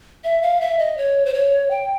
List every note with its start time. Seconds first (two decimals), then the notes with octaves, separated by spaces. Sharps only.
0.24 E5
0.42 F5
0.61 E5
0.79 D#5
0.98 C#5
1.26 C5
1.34 C#5
1.71 G5